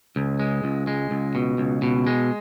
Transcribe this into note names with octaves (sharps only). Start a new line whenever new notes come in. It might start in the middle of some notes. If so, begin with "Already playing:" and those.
C#2
G#3
C#2
G#3
C#2
B2
C#2
B2
G#3